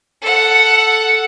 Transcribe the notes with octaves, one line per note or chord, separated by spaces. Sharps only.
A4 F#5